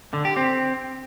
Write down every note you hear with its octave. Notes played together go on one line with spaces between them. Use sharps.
D3
G4
C4